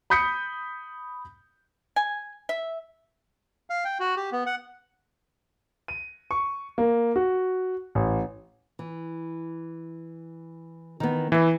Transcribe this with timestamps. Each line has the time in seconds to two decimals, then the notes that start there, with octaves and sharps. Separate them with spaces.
0.10 B5 D#6 G6 B6 C#7
1.96 G#5
2.49 E5
3.70 F5
3.85 G5
4.00 F#4
4.17 G4
4.32 B3
4.46 F#5
5.88 D#7
6.31 C#6
6.78 A#3
7.16 F#4
7.95 A1
8.79 E3
11.00 D#3 E3 B3
11.32 E3 E4 B4